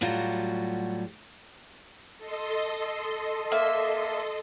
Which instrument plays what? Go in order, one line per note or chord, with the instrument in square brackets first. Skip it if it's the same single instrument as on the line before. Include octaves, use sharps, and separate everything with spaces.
[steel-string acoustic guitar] A2 F#3 G3 F4 F#4
[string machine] A4 D#5 C6
[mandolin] A#3 E5